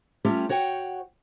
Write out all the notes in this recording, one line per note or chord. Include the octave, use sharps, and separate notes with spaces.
G3 A3 C#4 F4 G4
F#4 C#5 F#5 G5